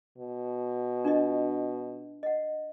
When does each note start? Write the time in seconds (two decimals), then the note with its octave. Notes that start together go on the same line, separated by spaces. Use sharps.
0.18 B2
1.05 D4 F4 D#5
2.23 D#5 F#5